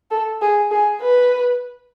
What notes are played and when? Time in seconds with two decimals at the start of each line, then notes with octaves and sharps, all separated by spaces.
0.11 A4
0.42 G#4
0.71 G#4
1.02 B4